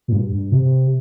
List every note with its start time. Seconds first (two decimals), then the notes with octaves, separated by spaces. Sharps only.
0.08 A#2
0.12 G2
0.32 G2
0.52 C3